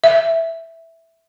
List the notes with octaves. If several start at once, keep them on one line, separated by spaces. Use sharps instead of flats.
E5